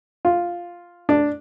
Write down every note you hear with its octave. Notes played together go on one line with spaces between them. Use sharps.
F4
D4